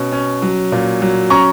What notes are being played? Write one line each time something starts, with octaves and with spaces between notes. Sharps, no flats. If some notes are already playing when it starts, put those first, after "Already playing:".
Already playing: B2 C#4
C#4
F#3
A#2
F#3
C#4 A#5 C#6